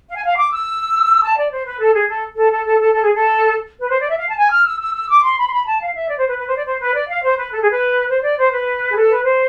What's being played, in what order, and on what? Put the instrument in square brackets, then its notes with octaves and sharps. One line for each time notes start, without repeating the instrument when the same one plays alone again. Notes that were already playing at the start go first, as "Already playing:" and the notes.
[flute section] F5
G#5
F5
D6
E6
A5
D5
C5
B4
A4
G#4
A4
A4
A4
A4
A4
A4
G#4
A4
B4
C5
D5
E5
F5
A5
G#5
F6
E6
E6
E6
D6
C6
B5
C6
B5
A5
F5
E5
D5
C5
B4
B4
C5
D5
C5
B4
D5
F5
C5
B4
A4
G#4
B4
C5
D5
C5
B4
G#4
A4
B4
C5